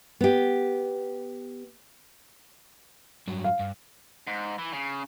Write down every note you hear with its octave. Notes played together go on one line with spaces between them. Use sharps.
B3 G4
G2 F#3
F5
G2
G#2
E3
C#3